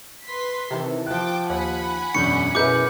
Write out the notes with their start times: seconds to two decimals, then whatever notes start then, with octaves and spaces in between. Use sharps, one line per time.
0.25 B4 C6 B6
0.71 C3 D#3 E3 A4
1.06 F3 G5 A5 D6 F#6
1.50 D#2 F#5 G#5 B5
2.15 E1 F#2 D4 C#6 G6 C#7
2.55 F#2 B2 E3 G#4 A#4 B4 D6 G6